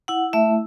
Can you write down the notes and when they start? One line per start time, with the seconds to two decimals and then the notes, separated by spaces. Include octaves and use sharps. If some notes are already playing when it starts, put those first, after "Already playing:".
0.08 E4 F#5
0.33 A3 E5